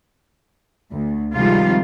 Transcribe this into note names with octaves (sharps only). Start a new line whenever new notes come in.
D2
C3 D#3 F3 G3 G#3 F4